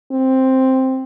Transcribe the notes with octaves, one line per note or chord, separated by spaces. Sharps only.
C4